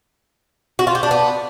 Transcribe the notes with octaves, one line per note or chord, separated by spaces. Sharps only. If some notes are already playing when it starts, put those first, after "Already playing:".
F#4
F4
G4
D4
B3